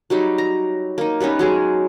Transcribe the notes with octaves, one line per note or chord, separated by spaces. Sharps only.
F#3 G3 D#4
A#5
A#3 D#4
G3 B3 C#4 D#4
F#3 G#3 G#4